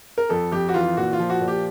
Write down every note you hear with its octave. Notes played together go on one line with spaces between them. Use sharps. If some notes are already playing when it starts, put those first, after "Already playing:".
A#4
F2 A4
F2 G4
F#4
E3 F4
A#2 F#4
F4
F3
F#4
A#2
G4